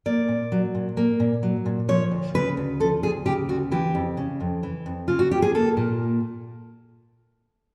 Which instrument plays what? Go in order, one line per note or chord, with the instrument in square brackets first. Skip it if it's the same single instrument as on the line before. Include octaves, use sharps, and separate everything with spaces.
[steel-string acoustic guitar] A#3 D5
A#2
F#3
A#2
A#3
A#2
F#3
A#2
F3 C#5
D2
C#3 B4
D2
F3 A4
D2 G#4
C#3 G4
D2 F#4
E3 G4
F2
C#3
F2
E3
F2
C#3 F4
F#4
F2 G4
G#4
A#3 A4
A#2